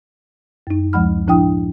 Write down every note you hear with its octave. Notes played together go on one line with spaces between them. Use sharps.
F#2 D#4
D2 F3 G#3 F#5 B5 F6
A2 F3 D4 E4 G5 D#6